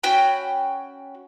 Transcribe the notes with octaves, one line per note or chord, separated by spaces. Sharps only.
C#4 F#4 G5 B5